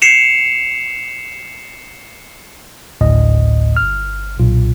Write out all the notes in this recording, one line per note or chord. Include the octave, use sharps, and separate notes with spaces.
C7 C#7 E7 F7
G#1 D2 A2 D#5
G1 F6
B1 A#2 F4